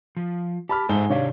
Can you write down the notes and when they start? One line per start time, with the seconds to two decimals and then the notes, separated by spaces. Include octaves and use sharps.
0.17 F3
0.69 G4 A5 B5 F6
0.89 G#2 A4 C5 E5 G#5 G7
1.10 C3 D#3 D4 G4 C#5 F5